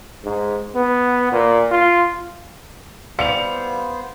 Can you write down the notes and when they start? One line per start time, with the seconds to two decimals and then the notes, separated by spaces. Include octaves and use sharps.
0.24 G#2
0.75 B3
1.32 A#2
1.71 F4
3.19 E3 G3 B3 C5 F5 C#7 F7